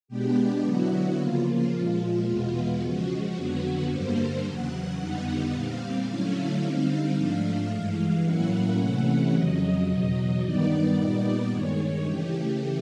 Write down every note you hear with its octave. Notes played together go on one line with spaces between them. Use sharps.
B2 G#3 B3 D4 G4
D3 F#3 B3 E4 F#4
C#3 F3 A#3 F4
A#2 F3 G#3 F4
E2 B2 G#3 B3
C#3 F3 G#3 F#4
F2 D3 F#3 B3
G2 D3 G3 A#3 C5
E2 C#3 F#3 F#5
F2 D3 G3 B3 D#4
A#2 G3 C4 F5
D3 F#3 A3 C#4 E4
D3 G3 C4 D#4
G#2 F3 A3 D4 F5
G2 E3 G#3
A2 F#3 A#3 C#4 E4 F#5
C3 E3 A3 C#4 E4
F2 C#3 F#3 D#5
E2 B2 F#3
G2 D#3 G3 B3 D#4 D5
A#2 G3 B3 D#4 D5
G2 D#3 G#3 C#5
C#3 E3 A3 G4